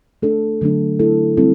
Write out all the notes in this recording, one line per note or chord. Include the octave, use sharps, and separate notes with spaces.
A3 D4 A4
D3 F#3 A3 D4
A3 E4 A4
G3 C4 E4 A4